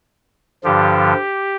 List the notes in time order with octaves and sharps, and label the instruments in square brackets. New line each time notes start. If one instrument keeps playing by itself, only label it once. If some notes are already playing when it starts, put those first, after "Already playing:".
[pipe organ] G2 D3 F3 G4